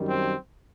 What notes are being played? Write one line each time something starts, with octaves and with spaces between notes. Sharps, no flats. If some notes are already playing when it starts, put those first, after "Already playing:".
Already playing: F#2 D#3 G3
C4